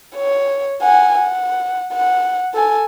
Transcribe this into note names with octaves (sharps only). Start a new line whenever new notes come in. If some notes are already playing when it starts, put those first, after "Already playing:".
C#5
F#5 G#5
F#5
F#5
A4 G#5